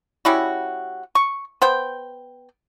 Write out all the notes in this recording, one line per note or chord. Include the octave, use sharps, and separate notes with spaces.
G3 C#4 E4 F#4
C#6
B3 C5 G5